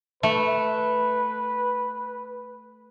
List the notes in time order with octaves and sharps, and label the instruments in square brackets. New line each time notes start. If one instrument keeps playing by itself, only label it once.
[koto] A3 [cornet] B4